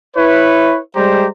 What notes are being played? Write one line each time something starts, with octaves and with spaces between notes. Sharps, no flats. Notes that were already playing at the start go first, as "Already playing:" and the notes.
E4 B4 C#5
G3 G#3 G4 C5 A#5